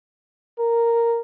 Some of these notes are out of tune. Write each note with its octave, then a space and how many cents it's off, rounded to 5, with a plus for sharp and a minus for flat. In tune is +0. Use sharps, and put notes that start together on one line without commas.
A#4 -5